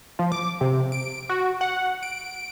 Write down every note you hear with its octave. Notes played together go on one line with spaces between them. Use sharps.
F3
D6
C3
D7
F#4
F#5
D7